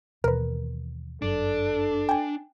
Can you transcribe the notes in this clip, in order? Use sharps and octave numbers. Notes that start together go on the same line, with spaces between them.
D#2 B2 E3 A#4 B4
G1 F#2 D4 A4
G5 G#5